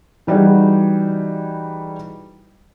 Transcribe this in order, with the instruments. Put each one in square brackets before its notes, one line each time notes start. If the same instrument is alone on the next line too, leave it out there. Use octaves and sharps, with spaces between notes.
[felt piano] E3 G3 D#4 F#4 G#4